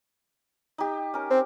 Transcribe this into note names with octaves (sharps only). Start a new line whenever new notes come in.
D#4 G4
C#4 A#4
C4